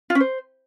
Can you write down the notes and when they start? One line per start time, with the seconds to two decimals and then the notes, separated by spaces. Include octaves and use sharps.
0.10 F4
0.15 C#4
0.20 C5